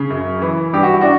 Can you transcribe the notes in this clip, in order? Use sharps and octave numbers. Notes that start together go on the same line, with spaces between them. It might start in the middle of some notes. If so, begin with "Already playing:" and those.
Already playing: C#3
F#2
E3
G2 G4
F#4
E4
D4 F#4